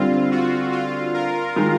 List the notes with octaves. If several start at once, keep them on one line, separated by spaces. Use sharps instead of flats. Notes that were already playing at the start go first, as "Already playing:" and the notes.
Already playing: D3 G3 C4 F4
F#4
F4
A#4
D#3 G#3